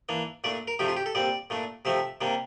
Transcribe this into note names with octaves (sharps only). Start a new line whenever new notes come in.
E3 A#3 D4
A#2 A3 D4 D5
A#4
C3 F3 A3 D4 G4
F4
G4
A4
A#2 G3 C4 D5
A#2 A3 D4
C3 F3 A3 C4 E5
C3 G3 A#3 D4